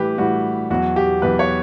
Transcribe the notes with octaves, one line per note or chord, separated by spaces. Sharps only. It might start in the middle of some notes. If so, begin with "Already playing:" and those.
Already playing: A2 E3 G3 G4 B4
A2 E3 G3 F#4
E2 B2 F#3 F#4
G4
E2 B2 F#3 B4
C#5